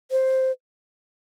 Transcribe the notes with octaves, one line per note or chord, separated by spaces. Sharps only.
C5